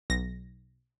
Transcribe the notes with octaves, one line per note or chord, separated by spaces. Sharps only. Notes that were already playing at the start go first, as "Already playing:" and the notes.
B1 A#6